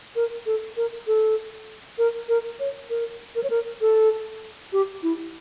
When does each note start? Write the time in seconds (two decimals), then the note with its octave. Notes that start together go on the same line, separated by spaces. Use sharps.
0.16 A#4
0.46 A4
0.77 A#4
1.07 A4
1.98 A#4
2.29 A#4
2.60 C#5
2.90 A#4
3.36 A#4
3.43 C#5
3.50 A#4
3.81 A4
4.73 G4
5.03 E4